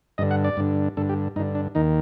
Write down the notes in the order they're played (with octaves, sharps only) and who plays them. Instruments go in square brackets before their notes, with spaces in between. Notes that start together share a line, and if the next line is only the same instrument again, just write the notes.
[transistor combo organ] G2 D3 D#5
F#5
D5
G2 D3
G2 D3 A4
G4
G2 D#4
D3
D4
D#2 D#3 D#4